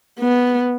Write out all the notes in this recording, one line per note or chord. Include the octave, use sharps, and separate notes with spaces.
B3